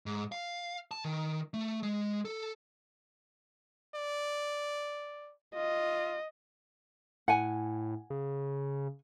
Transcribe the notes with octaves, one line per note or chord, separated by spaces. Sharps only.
G#2
F5
A5
D#3
A3
G#3
A4
D5
F4 D#5
A2 F#5 G#5
C#3